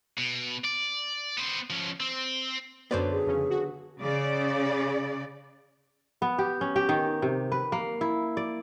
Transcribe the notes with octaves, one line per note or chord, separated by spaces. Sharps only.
B2
D5
B3 C5
F3 C#4
C4
F#2 D3 F#3 B3 C5 D5
G#4
F2 C#3 C#4
F#4
C#3 D5
B3
G4
C#4
G4
D#3
C3
B4
A#3
E4
D5